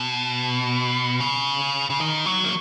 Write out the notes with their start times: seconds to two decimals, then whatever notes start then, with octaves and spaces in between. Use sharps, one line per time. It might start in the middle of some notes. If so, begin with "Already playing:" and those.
Already playing: B2
1.20 C#3
1.90 C#3
2.00 D#3
2.26 F#3
2.44 A#3